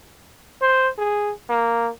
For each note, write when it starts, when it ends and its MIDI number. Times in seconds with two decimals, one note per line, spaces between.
0.62 0.89 72
0.98 1.32 68
1.49 1.89 58